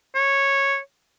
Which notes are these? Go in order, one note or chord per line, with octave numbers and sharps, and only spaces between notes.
C#5